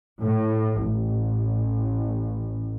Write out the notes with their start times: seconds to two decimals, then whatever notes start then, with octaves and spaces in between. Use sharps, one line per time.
0.21 A2
0.84 A1